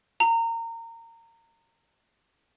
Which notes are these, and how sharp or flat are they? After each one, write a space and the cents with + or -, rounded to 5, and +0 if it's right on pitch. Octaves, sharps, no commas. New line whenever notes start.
A#5 -25